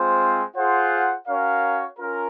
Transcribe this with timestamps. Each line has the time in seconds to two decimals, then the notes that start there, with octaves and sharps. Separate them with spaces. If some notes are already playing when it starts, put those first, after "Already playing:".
Already playing: G#3 C4 F4 C5
0.56 F4 G#4 C5 F#5
1.28 C#4 F#4 A#4 C#5 F5
1.98 C#4 F4 A#4